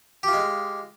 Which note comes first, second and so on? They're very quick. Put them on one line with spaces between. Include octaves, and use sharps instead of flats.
G4 F4 G#3